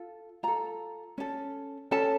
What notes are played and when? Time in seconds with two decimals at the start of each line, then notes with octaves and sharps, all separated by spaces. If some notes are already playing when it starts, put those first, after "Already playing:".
Already playing: F4 A4
0.43 F4 A4 A#5
1.18 C#4 A4
1.91 C#4 A4 A5